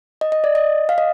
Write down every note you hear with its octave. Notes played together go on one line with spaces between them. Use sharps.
D#5
D#5
D5
D#5
F5
D#5